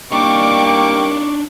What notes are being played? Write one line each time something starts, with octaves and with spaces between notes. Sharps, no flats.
G3 A#3 D4 D#4 G5 C#6 D6